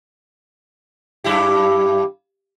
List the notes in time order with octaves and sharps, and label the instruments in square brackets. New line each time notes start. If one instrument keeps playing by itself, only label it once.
[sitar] F#2 E4 G4